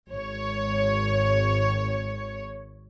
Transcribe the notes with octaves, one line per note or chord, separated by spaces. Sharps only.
G#1 C#5